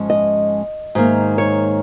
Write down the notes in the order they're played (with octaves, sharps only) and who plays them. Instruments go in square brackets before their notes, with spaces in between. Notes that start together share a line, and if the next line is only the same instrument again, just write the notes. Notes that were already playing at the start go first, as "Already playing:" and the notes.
Already playing: [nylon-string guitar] G#2 F3 G#3 C#4
D#5
G#2 D#3 A#3
C#5